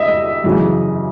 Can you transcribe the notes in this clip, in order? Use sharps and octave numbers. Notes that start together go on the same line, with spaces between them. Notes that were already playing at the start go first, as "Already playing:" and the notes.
Already playing: E2 D#5 E5
F#2 C#3 E3